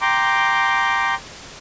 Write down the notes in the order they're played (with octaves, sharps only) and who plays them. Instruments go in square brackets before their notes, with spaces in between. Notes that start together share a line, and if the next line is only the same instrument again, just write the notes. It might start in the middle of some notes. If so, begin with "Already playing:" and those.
[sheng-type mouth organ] G5 A#5 C6 D6